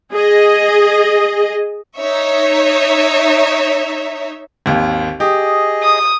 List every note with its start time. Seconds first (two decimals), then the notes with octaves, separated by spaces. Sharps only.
0.13 G#4 D#5
1.98 D#4 C#5 E5
4.66 G#1 D#2
5.20 G4 G#4 D#5
5.83 D#6